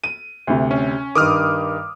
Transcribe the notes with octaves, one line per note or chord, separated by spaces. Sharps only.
D#7
D2 C3
C#4
G2 D#3 D6 D#6 F6